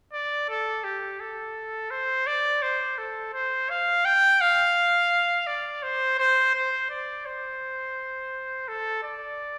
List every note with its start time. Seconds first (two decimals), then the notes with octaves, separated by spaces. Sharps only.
0.13 D5
0.49 A4
0.84 G4
1.20 A4
1.91 C5
2.27 D5
2.62 C5
2.98 A4
3.33 C5
3.70 F5
4.05 G5
4.41 F5
5.47 D5
5.83 C5
6.19 C5
6.55 C5
6.90 D5
7.26 C5
8.68 A4
9.03 D5